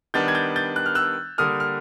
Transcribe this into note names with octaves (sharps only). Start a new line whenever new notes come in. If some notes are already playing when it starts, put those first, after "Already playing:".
D#3 G3 B3 D4 G6 A6
G#6
G6 A6
G6 A6
F#6
F6
E6 F#6
D3 G3 A#3 D#6 F6
F6